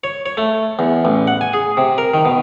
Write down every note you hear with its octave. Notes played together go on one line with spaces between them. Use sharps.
C#5
C#5
A3
E2
A1
F#5
G#5
G#4
C3
A#4
D#3
B2